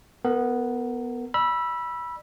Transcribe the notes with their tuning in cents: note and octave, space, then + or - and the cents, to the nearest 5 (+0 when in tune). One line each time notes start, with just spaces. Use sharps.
B3 +0 A#4 -30
D5 +35 B5 -20 E6 +10